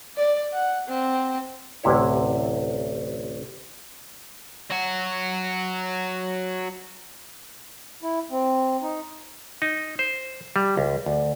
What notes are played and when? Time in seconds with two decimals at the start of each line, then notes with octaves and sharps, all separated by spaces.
0.17 D5
0.53 F#5
0.88 C4
1.83 A1 D2 C3 E4 C#5
4.70 F#3 F#4
8.03 E4
8.31 C4
8.82 D#4
9.62 D#4
9.99 C5
10.56 G3
10.77 C#2
11.06 D2